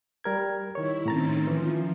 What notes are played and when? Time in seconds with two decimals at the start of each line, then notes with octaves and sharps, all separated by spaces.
0.24 G3 A#4 G#6
0.75 D#3 E4 C#5
1.06 A2 D#3 C4 C#4 A#5 A6
1.47 E3 F3